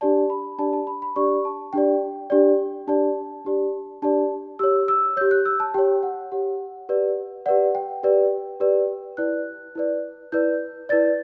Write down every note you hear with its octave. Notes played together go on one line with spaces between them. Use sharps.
D4 G4 D5 A5
B5
D4 G4 D5 A5
A5
B5
B5
D4 G4 D5 C#6
A5
D4 G4 D5 G5
D4 G4 D5
D4 G4 D5 A5
D4 G4 D5
D4 G4 D5 A5
G4 C#5 E6
E6
G4 C#5 G6
F#6
E6
A5
G4 C#5 G5
F#5
G4 C#5 F#5
G4 B4 D5
G4 B4 D5 F#5
G5
G4 B4 D5
G4 B4 D5
E4 B4 D5 F#6
E4 B4 D5
E4 B4 D5 G6
E4 B4 D5 A6